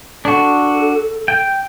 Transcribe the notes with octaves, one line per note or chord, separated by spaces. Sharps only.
D4 F#4 A4
G5